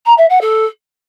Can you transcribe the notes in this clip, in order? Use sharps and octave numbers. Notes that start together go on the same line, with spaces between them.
A#5
E5
F#5
A4